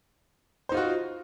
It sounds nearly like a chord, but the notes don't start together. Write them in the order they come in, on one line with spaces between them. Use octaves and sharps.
C5 D#4 F4 F#4